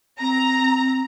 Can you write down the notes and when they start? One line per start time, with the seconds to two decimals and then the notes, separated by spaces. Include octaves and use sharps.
0.19 C4 A#5